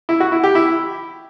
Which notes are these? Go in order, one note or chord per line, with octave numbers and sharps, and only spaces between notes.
E4
F#4
E4
G4
E4